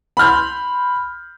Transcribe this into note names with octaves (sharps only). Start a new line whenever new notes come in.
B5 C6 F6 G6